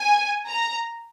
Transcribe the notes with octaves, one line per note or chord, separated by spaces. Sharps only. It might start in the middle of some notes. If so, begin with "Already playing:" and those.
Already playing: G#5
A#5